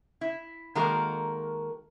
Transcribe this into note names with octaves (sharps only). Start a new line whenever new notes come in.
E4
D#3 G#3 A#3 F#4 A4 A#4